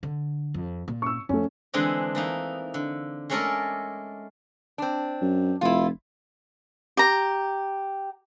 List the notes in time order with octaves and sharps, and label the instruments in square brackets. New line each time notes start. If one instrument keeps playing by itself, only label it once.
[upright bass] D3
F2
A#2
[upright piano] C#6 E6
[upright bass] F2 [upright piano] A3 C#4
[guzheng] D3 E3 G#3 C4 D4 D#5
E3 A#3 D#4
D3
G#3 A3 C#4 A4 A#4 D5
[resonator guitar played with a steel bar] C4 D4
[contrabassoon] F#2
[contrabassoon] F1 [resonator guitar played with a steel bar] E4 F4
[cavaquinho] G4 A#5